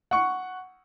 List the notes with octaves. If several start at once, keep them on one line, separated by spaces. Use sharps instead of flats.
F#5 C#6